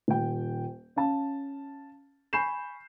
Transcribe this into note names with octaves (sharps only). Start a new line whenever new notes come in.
D#1 G5
C#4 F5 A5
G#5 B5 C#6 G6 C7 E7